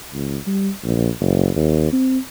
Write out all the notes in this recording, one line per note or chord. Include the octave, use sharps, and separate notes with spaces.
C#2
G3
A#1
F#1
D#2
C4